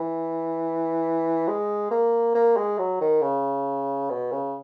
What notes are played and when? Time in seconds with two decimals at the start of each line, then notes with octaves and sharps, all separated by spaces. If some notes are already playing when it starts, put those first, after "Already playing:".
Already playing: E3
1.48 G#3
1.91 A#3
2.35 A#3
2.57 G#3
2.78 F#3
3.01 D#3
3.22 C#3
4.10 B2
4.32 C#3